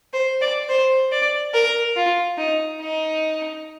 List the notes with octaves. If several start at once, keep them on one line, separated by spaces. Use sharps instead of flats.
C5
D5
C5
D5
A#4
F4
D#4
D#4